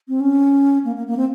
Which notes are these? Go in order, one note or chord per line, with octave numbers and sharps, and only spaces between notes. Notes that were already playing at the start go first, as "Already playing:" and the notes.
C4
C#4
A#3
A#3
A#3
C4